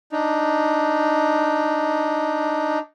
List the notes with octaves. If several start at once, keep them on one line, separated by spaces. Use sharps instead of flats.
D4 D#4